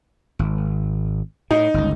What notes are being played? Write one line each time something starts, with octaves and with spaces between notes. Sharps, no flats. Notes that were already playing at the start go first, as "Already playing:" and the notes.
G#1
A2 D#4
G1 C#2